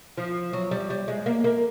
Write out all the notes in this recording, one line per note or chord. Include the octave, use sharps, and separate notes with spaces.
F3
F#3
G3
G3
G#3
A#3
A#3